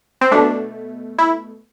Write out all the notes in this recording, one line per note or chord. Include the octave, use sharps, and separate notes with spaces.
C4
B2 A3 D4
E4